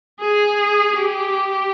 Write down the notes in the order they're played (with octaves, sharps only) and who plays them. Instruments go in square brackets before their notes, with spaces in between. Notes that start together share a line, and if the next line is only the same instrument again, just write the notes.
[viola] G#4
G4